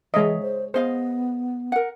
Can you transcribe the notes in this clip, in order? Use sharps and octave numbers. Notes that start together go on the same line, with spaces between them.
E3 G#3 G#4 C#5 D#5 E5
C5
B3 G#4 C5 D#5 F5
A#4 F#5